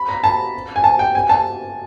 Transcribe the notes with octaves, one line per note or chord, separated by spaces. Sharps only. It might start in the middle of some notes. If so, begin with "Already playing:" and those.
Already playing: B5
A#5
A5
G#5
A5
G5
G#5
A5